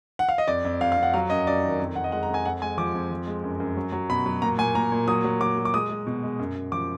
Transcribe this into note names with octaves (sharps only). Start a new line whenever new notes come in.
F#5
F5
D#5
F2 D5
F2
F2 F5
F5
F2
F#5
F#3 F5
F#2 D#5
F#2 D5
D#3
F2
F2 F#5
D#5
G#3 F#5
A#5
F2
G#5
F2 F#5
G#3 G#5
F3 D6
F2
F3
G#3
F#2
F#2
F#3
F#3
B2 B5
F#3
A#2 A#5
A#2 G#5
A#2 A#5
A#2
F#3 D#6
F#3
F#3 D6
F#3
D6
G#3 D#6
G#3
B2
G#3
F#2
F#2
F3 D6